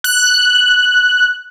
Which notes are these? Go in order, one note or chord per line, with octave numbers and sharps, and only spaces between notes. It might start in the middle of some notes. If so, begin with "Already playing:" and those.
F#6